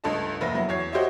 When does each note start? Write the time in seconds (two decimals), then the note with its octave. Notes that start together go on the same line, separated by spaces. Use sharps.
0.04 C#2 G2 A3 D#5 A5
0.41 F1 A#3 B4 E5 A#6
0.55 F#3 B3 E4
0.69 E2 C#5 G#6 C7
0.92 F#4 G4 C5 C#5 D#5 E5